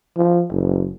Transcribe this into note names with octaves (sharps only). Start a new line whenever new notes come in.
F3
F#1